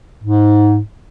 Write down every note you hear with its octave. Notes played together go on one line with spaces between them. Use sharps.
G#2